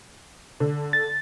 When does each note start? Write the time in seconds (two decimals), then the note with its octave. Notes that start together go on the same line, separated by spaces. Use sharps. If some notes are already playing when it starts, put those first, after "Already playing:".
0.60 D3
0.93 A6